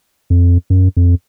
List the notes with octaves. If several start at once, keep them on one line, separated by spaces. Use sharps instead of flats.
F2
F#2
F2